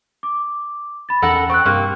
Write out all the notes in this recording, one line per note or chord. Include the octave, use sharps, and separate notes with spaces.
D6
B5 A6
E2 C#4 A4 A#4 F#5
C4 C#6 F#6
G2 C3 A#3